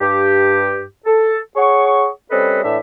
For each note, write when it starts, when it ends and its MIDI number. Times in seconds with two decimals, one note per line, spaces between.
0.01 0.83 43
0.01 0.83 67
1.06 1.38 69
1.56 2.08 68
1.56 2.08 73
1.56 2.08 78
1.56 2.08 85
2.31 2.61 55
2.31 2.61 60
2.31 2.61 61
2.31 2.61 69
2.31 2.61 71
2.31 2.61 75
2.62 2.77 45
2.62 2.77 52
2.62 2.77 62
2.62 2.77 76